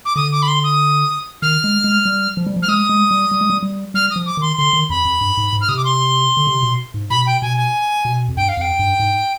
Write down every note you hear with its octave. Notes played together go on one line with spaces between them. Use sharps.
D6
D3 D#6
D6
B5
C6
D#6
D#3 F6
G#3
G#3
G3
F3
G3
F3
F6
G#3 D#6
G#3
G3
G3
G#3
G3
G3
G3 F6
D#6
F3
D6
D#3 C6
D3 C6
D#3
F2 B5
F2
G2
G#2
G#2
F6
C3 D#6
D6
C6
D3
C3
B2
G#2
B2 B5
G5
B2 G#5
G#5
B2
F2
G2 G5
F5
F2 G5
G2
G#2